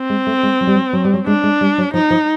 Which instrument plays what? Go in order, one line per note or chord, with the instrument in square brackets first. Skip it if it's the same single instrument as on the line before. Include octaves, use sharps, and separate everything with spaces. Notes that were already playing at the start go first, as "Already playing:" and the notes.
Already playing: [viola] C4
[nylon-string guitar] G#3
A3
G#3
F#3
G3
F#3
F#3
G3
F#3
[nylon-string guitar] G#3 [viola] D4
[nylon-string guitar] G#3
G3
F#3
[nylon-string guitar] F3 [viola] D#4
[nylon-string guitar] F3